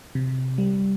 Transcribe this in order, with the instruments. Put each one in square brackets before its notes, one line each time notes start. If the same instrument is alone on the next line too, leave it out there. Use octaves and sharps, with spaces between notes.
[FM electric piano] C3
G3